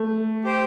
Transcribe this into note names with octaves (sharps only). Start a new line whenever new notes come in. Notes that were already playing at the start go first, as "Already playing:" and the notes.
Already playing: A3
G4 C5 G5